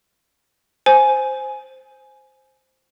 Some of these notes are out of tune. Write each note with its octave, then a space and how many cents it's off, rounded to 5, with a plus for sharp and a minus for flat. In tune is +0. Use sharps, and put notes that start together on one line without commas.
C5 +0 G#5 +10